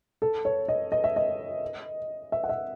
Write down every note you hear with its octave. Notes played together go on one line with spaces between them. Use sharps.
A4
C#5
D#5
D#5
E5
D#5
E5
F#5
E5